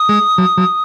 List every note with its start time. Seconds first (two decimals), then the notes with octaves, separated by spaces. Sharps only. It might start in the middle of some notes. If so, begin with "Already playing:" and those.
Already playing: D#6
0.09 G#3
0.38 F#3
0.58 F#3